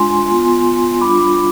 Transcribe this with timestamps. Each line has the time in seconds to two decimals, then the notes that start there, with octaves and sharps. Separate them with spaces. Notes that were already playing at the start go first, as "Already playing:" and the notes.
Already playing: G#3 D4 F4 G#5 C6
0.28 B3 F4
1.01 G3 D4 F4 B5 D6